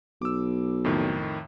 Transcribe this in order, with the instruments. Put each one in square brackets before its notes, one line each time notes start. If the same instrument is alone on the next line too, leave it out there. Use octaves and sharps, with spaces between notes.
[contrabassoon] B1 [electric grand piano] D6 E6
[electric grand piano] F2 A2 D#3